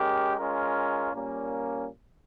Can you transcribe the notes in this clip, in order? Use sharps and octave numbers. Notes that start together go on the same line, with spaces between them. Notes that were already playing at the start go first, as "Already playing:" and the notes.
Already playing: G#3 C#4 G4 A#4
G#3 C#4 F4 A#4
A#2 G3 A#3 C#4